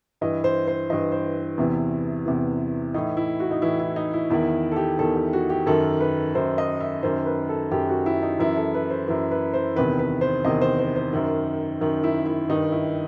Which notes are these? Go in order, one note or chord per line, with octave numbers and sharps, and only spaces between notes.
G2 E3 D#5
C5
C5
G2 E3 D#5
C5
E2 C3 E3
E2 C3 E3
A2 E3 D#4
E4
F#4
D#4
A2 E3 E4
E4
D#4
E4
E2 D#3 E4
A4
G4
E2 D#3 A4
G4
F#4
G4
F#2 D#3 A4
B4
F#2 D#3 C5
D#5
E5
F#2 D#3 C5
B4
A4
F#2 D#3 G4
F#4
E4
D#4
F#2 E3 E4
A4
B4
C5
F#2 E3
B4
C5
E2 C3 D#3 B4
B4
C5
E2 C3 D#3 D#5
C5
C5
C5
F#2 D#3
F#2 D#3
E4
E4
G2 D#3 D#4
E4